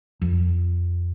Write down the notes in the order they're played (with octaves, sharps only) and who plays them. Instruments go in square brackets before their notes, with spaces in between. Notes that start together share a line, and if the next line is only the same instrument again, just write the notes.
[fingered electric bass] F2